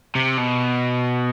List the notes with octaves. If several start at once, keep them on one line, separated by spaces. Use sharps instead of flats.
C3
B2